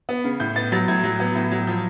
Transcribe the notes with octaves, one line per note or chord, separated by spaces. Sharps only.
B3
C#3
A2 G6
B3 A6
F#3 A6
A2 G#6
F#3
B3
A2
F#3
F3